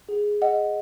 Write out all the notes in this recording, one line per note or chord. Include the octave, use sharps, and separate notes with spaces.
G#4
D#5 F#5